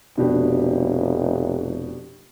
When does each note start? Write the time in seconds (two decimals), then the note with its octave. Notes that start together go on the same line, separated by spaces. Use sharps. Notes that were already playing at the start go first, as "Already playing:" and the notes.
0.17 F1 B2 D4 G4